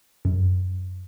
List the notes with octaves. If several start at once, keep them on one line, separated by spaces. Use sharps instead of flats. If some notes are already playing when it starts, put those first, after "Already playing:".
F#2